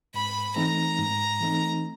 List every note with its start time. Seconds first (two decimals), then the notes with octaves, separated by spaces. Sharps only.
0.14 G#2 B5
0.56 E3 A3 C4 D#4 A#5
0.98 G#2
1.41 E3 A3 C4 D#4